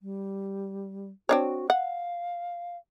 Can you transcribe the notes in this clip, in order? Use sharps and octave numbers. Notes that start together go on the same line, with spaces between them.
G3
C4 D4 F#4 C#5
F5 F#5